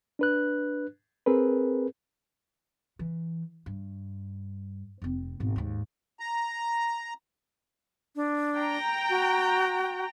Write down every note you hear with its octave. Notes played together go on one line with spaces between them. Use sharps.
D4 B4 F#6
C4 G#4 A#4 B4
E3
G2
F1 C4
G#1 B2
D#2 G#2
A#5
D4
G5 A#5
F#4